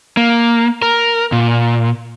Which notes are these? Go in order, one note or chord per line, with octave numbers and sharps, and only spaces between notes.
A#3
A#4
A#2